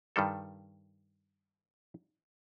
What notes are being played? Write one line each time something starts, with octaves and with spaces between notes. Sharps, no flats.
G2 D#3 G3 A4